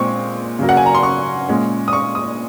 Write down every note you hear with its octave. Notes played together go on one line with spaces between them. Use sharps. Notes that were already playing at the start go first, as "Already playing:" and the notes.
Already playing: A#2 G#3 C4 C#6
C#3 F#3 A#3
F#5
G#5
A#5
C6
C#6
A#2 G#3 C#4
D#6
C#6
D#6